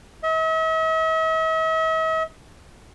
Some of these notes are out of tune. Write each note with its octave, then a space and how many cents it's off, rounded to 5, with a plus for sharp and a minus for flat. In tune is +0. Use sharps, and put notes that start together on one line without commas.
E5 -45